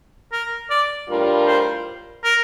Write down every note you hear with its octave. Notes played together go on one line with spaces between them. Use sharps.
A#4
D5
A2 G3 D4 F4 A#4
C5
A#4